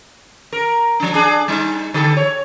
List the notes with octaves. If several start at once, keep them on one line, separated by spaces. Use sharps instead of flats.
A#4
F3 D4
D4 G#4
G3 D#4
D3 G4 A4
C#5